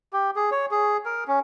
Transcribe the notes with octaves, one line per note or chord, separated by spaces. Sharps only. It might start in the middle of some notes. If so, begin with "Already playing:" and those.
G4
G#4
C#5
G#4
A#4
C#4